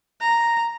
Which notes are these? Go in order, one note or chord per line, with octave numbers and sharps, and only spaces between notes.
A#5